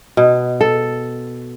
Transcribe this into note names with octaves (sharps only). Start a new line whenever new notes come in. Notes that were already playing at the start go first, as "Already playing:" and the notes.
B2
A4